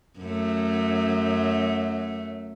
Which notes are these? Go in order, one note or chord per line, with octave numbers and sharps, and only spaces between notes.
F#2 A3